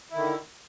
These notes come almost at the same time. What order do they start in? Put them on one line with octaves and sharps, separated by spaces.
E4 D#3 D3